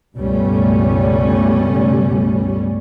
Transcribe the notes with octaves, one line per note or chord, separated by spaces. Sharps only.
C#2 G2 B2 G3 A3 C#4